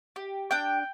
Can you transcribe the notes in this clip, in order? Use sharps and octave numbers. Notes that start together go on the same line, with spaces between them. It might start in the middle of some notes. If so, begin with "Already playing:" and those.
G4
D4 G5